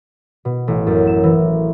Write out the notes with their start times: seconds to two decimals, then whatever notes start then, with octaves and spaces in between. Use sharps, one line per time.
0.45 B2
0.68 A1
0.87 F#2
1.07 E7
1.24 E3